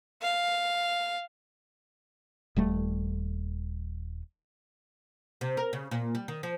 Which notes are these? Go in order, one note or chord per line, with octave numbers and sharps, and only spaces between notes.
F5
D#1 G3 A3
C3
A#4
C#3
A#2
G3
D#3
F3